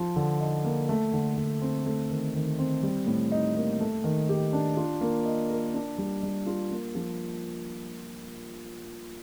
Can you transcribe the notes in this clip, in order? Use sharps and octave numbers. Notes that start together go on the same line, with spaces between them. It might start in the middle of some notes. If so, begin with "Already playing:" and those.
Already playing: F3
D3
D#4
A#3
A3
D3
D3
C4
A3
D#3
D#3
C4
G3
A2
D#4
A#3
A3
D#3
G4
D4
F4
A#3
D#5
A#4
D4
G3
G3
F4
A#3
F3